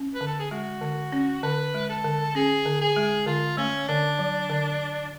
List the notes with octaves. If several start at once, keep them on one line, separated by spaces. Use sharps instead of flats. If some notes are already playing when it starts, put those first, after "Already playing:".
Already playing: C#4
B4
D3
A4
G#4
G#3 F#4
D3
C#4
D3 B4
G#3
A4
D3
C#4 G#4
D3
G#4
G#3
D3 F4
A3 C#4
D3 D4
F#3
D3